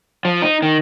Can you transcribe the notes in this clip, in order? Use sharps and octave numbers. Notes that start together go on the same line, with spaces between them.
F3
D#4
D#3